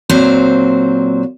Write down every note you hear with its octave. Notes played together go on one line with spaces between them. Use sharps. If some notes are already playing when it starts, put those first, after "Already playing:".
A#2 F#3 C4 C5